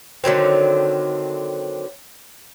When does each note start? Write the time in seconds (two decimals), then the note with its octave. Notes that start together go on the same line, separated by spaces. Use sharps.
0.24 D3 D#3 F#3 C4